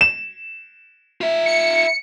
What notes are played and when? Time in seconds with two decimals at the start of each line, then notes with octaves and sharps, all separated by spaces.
0.01 E7
1.21 F4 E5
1.46 C#7